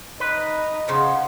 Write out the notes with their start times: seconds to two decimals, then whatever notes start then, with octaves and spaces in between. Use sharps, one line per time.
0.20 D#4 B4
0.88 C#3 F3 F5 F#5 C6